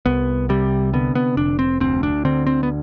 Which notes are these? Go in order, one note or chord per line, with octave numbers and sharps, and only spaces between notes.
C2 B3
C3 G3
D3 B3
B3
F1 D4
C4
D2 C4
D4
D3 C4
C4
B3